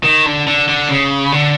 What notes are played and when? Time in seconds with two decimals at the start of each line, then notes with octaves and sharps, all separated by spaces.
0.04 D#3
0.26 D3
0.47 D3
0.68 D3
0.89 C#3
1.32 D3